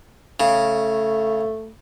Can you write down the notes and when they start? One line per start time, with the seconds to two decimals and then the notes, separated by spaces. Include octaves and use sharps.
0.40 C#3 A3